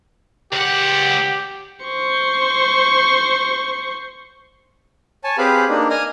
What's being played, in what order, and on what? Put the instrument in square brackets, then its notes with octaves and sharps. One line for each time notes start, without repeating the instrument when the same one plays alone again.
[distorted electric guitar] C#2 F#5 [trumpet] G4
[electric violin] C5 C#6
[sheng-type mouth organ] C#5 G#5 A5
C4 G4 G#4 B4 F5 B5
A#3 D4 D#4
D#5 G#5 D#6 F6